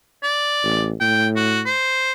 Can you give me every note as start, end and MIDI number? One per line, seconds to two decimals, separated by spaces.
0.23 0.87 74
0.64 0.93 33
1.00 1.71 45
1.00 1.27 79
1.36 1.60 66
1.66 2.12 72